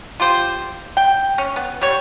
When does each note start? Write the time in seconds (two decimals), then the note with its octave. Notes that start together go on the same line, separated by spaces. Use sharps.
0.20 F4 G4 C5
0.97 G5
1.38 C#4
1.56 B3
1.81 G3 C#5